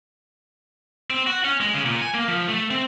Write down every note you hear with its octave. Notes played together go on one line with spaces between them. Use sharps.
C4
F#4
C#4
G#3
C#3
A#2
G#5
A#3
F3
A3
C4